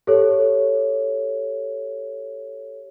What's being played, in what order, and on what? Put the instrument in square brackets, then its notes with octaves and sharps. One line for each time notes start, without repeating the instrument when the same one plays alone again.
[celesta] G4 A4 C#5